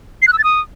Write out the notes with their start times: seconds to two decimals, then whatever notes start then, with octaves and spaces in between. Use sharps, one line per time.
0.22 C7
0.27 F#6
0.33 E6
0.38 A6
0.44 D#6